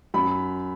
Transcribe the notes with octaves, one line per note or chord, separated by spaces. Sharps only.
F#2 B5